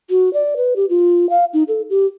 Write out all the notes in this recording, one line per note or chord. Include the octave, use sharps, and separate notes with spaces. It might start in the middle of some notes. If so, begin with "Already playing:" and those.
F#4
D5
B4
G4
F4
F5
D#4
A4
G4